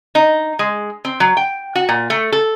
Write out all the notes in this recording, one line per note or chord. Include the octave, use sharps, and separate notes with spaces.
D#4
G#3
C4
F#3
G5
F#4
A#2
A3
A4